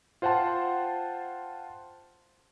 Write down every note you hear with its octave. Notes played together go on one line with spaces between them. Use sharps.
F4 C5 F#5 G5 A5 C6